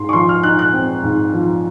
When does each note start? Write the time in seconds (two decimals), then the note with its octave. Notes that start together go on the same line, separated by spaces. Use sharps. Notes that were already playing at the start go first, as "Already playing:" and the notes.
Already playing: G#2 C6
0.09 C#6
0.13 F3 C6
0.29 F6
0.43 D#4 F#6
0.59 F#6
0.73 C4
1.03 G#2
1.33 F3